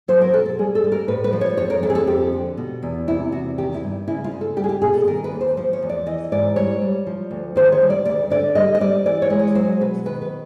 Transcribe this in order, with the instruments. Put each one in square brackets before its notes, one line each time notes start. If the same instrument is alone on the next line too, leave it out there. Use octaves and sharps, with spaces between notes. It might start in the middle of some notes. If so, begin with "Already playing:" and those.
[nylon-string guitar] F#3 C5
A#4
B2 A4
A4
G3 G#4
A4
G3
A#4
A2 B4
B4
F3
C#5
F2 C#5
A#4
F2 A4
G#4
A4
F3 G4
D3
B2
E2
C3 E4
E2 F#4
D#3 G4
E4
G2
C#3 E4
F4
C#3
A4
G3 G4
G#4
G4
B2 G#4
A4
D#3 A#4
B4
D#2
C5
F3 C5
C#5
E2
D5
E3 D#5
G#2 D5
G3 C#5
G3
F3
D2
D#3 C5
C#5
G3
D5
D2 D5
D3 D5
G3 D#5
D#5
G3 D5
E3 D5
C#5
G#3
C#5
F#3 C5
B2 B4
D#3 B4
B4